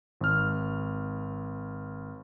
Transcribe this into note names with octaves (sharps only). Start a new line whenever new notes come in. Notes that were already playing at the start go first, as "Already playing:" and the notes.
G#1 F6